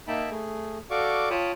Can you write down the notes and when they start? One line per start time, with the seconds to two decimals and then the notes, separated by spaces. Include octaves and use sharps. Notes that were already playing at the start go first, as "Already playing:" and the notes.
0.08 A#3 D#4 E5 G5 A5 B5
0.31 A3 G#4
0.90 F#4 A4 D5 F5 C#6 D6
1.30 F4 C#5 G5 A5 B5 D#6